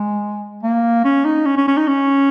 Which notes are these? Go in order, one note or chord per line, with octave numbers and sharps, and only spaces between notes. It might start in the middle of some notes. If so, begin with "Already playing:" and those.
Already playing: G#3
A#3
C#4
D#4
C#4
C#4
C#4
D#4
C#4